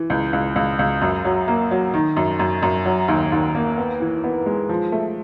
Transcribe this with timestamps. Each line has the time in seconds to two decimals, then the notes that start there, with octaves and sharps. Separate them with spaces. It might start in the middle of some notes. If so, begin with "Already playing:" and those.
Already playing: E3
0.10 C#2
0.33 C#2
0.56 C#2
0.79 C#2
1.02 F#2
1.25 F#3
1.48 A#3
1.71 F#3
1.93 D#3
2.17 F#2
2.39 F#2
2.63 F#2
2.86 F#3
3.08 D#2
3.32 D#2
3.55 A#3
3.78 B3
4.00 E3
4.24 B3
4.46 G#3
4.69 F3
4.92 A3